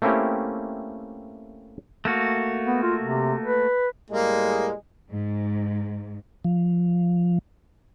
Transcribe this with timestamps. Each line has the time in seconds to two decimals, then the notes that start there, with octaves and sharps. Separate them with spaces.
0.02 A3 A#3 C4 C#4 E4 G4
2.05 A3 A#3 F#4
2.65 B3
2.82 F4
3.01 C3
3.44 B4
4.11 A2 G3 G#3 A#3
5.11 G#2
6.44 F3